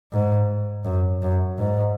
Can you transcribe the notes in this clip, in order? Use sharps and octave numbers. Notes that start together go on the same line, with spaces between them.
G#2
F#2
F#2
G#2